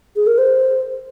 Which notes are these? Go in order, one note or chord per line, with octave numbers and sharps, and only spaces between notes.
G#4
A#4
C5